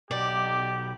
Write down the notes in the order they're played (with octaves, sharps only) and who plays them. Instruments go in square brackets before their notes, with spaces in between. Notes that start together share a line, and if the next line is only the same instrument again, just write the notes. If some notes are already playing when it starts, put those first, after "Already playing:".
[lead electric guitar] B1 [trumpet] G4 [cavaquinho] D5